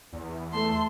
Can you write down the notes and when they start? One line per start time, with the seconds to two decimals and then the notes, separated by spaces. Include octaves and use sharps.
0.13 E2
0.53 A3 A5 C6